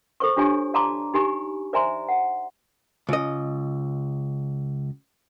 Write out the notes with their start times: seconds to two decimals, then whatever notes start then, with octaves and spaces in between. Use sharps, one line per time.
0.20 A4 C5 C#6
0.37 D4 F4 G4 C#5 G#5 C#6
0.74 D5 F5 A5 A#5 C6 D6
1.14 D#4 G4 G#5 B5 C#6
1.73 C5 D5 E5 G#5 A#5 C6
2.09 F#5
3.09 C#2 D#5